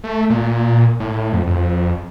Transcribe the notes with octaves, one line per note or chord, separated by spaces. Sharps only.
A3
A#2
A2
F2
F2